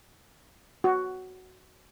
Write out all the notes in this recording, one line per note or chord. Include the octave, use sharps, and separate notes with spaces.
F#4